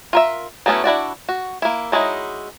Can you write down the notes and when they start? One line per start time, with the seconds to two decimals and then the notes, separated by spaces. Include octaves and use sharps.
0.13 F4 A#4 E5
0.66 F#3 A3 B3 C#4 E4
0.84 D4 E4 F#4 D5
1.29 F#4
1.62 A#3 E4
1.92 F#3 G#3 D#4 E4